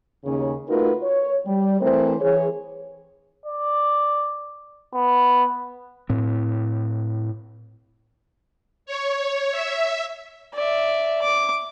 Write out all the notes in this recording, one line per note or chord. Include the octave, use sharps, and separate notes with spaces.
D#2 C#3 C#4
A3 D#4 F4 F#4 A#4 B4
C#5
G3
E3 A3 C4 A#4 C5
E3 G#4 C#5
D5
B3
A2 C4
C#5
E5
D5 E5
D6